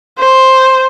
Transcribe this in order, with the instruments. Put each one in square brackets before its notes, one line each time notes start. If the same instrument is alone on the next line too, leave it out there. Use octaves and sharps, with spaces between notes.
[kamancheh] C5